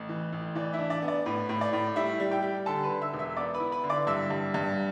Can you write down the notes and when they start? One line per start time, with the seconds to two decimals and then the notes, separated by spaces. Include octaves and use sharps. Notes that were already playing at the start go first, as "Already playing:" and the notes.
Already playing: A1
0.09 E3
0.33 A1
0.55 E3 D5
0.73 E4 E5
0.79 D4
0.90 D5
1.02 B3
1.08 D5
1.26 A2 B4
1.49 A2
1.61 D5
1.73 A2
1.96 G3 E4 E5
2.20 G3
2.31 G4 G5
2.43 G3
2.66 D3 A4 A5
2.83 B4 B5
2.90 D3
3.01 E5 E6
3.13 E1
3.19 E5 E6
3.36 B3 D5 D6
3.54 B4 B5
3.60 E4
3.72 B4 B5
3.83 D3
3.90 D5 D6
4.07 G2 E5 E6
4.30 G2
4.54 G2